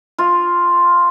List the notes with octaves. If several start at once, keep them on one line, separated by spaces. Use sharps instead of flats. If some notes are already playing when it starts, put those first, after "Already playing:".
F4